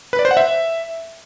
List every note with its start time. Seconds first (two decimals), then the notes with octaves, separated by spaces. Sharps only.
0.13 B4
0.19 D5
0.25 C5
0.31 F#5
0.37 E5